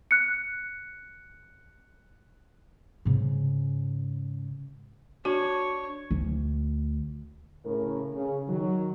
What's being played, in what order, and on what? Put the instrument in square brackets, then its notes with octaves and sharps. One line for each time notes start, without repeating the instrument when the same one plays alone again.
[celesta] F#6 C#7
[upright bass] G#2 C#3
[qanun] D4 [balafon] F#4 [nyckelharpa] C#5
[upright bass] D2
[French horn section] A2 C#3 A3 A#4
C#3
D#3 F#3